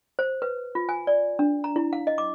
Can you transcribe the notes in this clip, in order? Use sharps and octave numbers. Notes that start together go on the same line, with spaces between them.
C5
B4
F4
G#5
D5
D4
A#5
E4
F5
D#5
D6